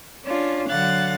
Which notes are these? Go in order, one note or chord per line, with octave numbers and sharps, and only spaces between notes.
C#4 D4 F4
D3 F#3 F5 F#5 F#6 A6